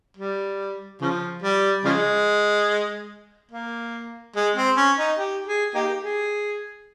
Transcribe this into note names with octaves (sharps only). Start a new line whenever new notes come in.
G3
C#3 F3
G3
C#3 F3 G#3
A#3
G#3
C4
C#4
D#4
G4
G#4
A#3 D#4 G4
G#4